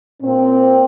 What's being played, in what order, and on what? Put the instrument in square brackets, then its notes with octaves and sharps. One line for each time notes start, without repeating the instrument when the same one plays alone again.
[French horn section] A#2 C4